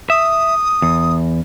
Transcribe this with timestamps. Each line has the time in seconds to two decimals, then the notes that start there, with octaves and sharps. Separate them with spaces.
0.10 E5 D#6
0.82 E2